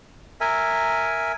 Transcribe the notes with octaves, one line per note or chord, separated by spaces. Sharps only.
A#4 E5 G#5